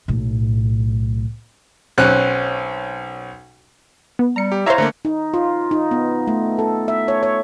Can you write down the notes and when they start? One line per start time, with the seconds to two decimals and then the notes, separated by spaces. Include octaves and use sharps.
0.08 B1 A2
1.98 B1 C4 C#4 F#6
4.19 B3
4.36 G3 A#5 C#7
4.52 G4
4.66 E4 C5 C#5 E5 F5 A#5
4.78 D3 A3 A#3
5.05 D#4
5.34 F4
5.71 D#4
5.91 B3
6.27 A3
6.59 A4
6.88 E5
7.08 C#5
7.23 C#5